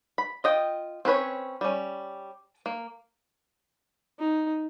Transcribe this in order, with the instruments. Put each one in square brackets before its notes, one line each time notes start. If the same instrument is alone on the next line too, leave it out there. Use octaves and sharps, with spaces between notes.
[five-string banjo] B5
F4 D#5 G5
C4 C#4 B4 C#5
G3 C#4
A#3
[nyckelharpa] D#4